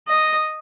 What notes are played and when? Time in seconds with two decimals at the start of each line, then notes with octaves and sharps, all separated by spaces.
0.08 D#5